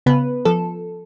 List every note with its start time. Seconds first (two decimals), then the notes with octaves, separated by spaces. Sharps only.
0.06 C#3 B3 B4
0.45 F3 A4